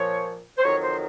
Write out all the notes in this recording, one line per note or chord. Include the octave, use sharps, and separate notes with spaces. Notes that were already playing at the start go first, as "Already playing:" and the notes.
Already playing: A#2 F3 C#5
C5
F2 D#3 F#3 C#5
C5